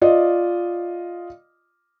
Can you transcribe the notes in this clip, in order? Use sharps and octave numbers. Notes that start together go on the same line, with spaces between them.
F4 D5 D#5